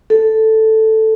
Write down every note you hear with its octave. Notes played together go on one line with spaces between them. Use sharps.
A4